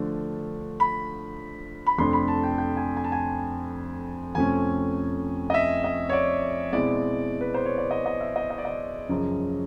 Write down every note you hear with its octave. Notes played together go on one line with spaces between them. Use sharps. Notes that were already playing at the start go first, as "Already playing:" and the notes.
Already playing: D3 F3 A3 D4
B5
B5
F2 C3 F3 A3 D4 C6
B5
A5
G5
G5
G#5
G#5
A5
G#5
F2 C3 F3 A3 C#4 G#5
D#5
E5
D#5
C#5
D5
B2 G#3 C4 E4 D5
B4
C5
C#5
D5
D#5
D#5
E5
D#5
D#5
D5
D#5
F#2 C#3 F3